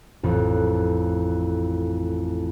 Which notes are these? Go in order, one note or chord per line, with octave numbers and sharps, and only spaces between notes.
A1 F2